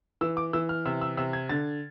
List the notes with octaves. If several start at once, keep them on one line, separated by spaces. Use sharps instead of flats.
E3 E6
D6
E3 E6
F6
C3 E6
E6
C3 E6
G#6
D3 A6